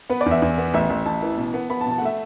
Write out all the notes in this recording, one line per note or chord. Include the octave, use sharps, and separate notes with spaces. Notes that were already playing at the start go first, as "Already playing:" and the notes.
B3 B4
D5
E2
E5
E2
B3
A1 E5
A1
A1 A5
E3
B2
B3
B3 B5
A5
B2
A5
F#5
A3 E5